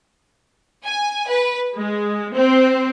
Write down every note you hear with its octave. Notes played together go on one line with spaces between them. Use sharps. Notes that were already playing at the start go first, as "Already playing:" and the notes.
G#5
B4
G#3
C4